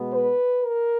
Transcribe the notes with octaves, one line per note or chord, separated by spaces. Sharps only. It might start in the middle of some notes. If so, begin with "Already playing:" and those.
Already playing: B2 G#3 B3
B4
A#4